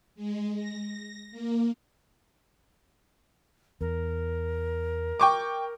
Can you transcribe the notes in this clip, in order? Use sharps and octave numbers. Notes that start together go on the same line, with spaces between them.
G#3
A#6
A#3
E2 A#4
G5 C#6 D6